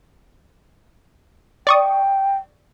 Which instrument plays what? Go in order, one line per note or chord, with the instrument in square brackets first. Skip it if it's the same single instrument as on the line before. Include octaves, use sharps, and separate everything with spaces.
[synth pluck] D5 C#6 D#6 [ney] G5